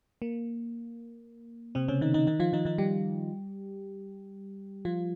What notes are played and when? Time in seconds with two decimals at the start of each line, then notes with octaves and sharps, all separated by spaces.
0.22 A#3
1.75 C3 C4
1.88 C#3 C#4
2.01 D#3 D#4
2.14 D#3 D#4
2.27 D#3 D#4
2.40 F3 F4
2.53 D#3 D#4
2.65 D#3 D#4
2.78 G3 G4
4.85 F3 F4